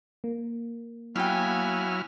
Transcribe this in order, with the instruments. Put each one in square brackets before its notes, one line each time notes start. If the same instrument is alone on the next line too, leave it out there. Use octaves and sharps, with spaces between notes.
[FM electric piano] A#3
[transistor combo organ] F#3 E4 F6 [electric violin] B3 G#5 [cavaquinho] F5 G5